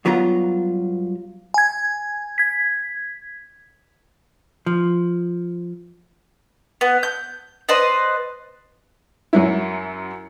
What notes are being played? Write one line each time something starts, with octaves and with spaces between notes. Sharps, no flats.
G2 F#3 B3 F4 A#5
G#5 G#6
G#6 B6
F3
B3
G6
B4 C5 D5 D#5
F#2 F#3 E4